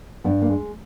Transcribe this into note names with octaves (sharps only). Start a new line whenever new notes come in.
G2 B3
A#3
G#3